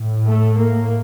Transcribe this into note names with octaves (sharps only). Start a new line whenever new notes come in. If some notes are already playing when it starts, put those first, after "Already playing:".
Already playing: A2
A3
A#3